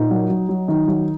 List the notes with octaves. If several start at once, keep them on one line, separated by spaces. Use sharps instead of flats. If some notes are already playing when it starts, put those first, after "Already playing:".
Already playing: A#2 D#4
F#3
F#3
F#3
D#3 D#4
F#3